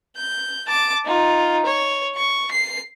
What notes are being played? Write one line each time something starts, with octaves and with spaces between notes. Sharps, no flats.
G6
A5 D6
D#4 F4
C#5
C#6
C7